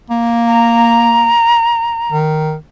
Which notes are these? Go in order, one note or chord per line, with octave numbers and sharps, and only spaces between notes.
A#3
A#5
D#3